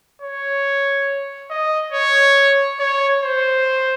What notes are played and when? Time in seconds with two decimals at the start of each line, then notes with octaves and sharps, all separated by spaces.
0.22 C#5
1.50 D#5
1.92 C#5
2.80 C#5
3.22 C5